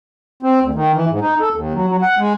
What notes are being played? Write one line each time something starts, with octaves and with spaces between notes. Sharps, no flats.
C4
D2
D#3
E3
G#2
D#4
A4
D#2
F#3
F#3
F#5
G#3